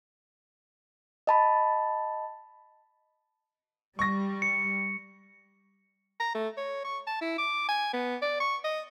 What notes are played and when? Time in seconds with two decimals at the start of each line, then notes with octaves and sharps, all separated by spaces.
1.27 D#5 A5 B5
3.99 G3 C#6 A#6
4.42 C#7
6.20 A#5
6.34 A3
6.57 C#5
6.85 C#6
7.07 A5
7.21 E4
7.38 D6
7.69 G#5
7.93 B3
8.22 D5
8.40 C#6
8.64 D#5